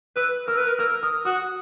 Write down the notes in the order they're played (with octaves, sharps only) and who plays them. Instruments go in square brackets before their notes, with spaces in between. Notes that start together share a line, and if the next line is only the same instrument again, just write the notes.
[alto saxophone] B4 [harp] E6
[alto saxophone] A#4 [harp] E6
[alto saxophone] B4
A#4
[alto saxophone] A#4 [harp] E6
[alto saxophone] A#4 [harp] D#6
[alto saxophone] F#4 [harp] D#6